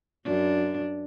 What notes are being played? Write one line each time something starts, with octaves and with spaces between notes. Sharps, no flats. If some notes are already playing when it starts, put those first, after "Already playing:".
F#2 D4